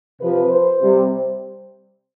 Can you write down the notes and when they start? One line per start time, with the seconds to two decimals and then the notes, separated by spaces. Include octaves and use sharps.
0.20 C3 F3 B4
0.50 C5
0.80 C3 G3